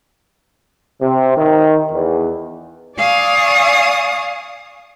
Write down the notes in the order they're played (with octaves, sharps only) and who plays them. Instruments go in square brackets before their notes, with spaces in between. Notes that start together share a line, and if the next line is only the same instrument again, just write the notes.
[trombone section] C3
D#3
E2
[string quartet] D5 F5 G#5 C#6 D#6